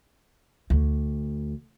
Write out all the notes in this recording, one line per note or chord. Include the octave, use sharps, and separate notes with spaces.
D2